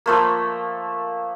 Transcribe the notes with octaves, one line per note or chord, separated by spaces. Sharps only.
F3 A3 A#3